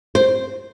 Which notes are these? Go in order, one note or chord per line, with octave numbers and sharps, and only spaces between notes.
C5